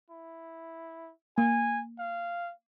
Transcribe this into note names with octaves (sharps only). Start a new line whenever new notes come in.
E4
A#3 G#5
F5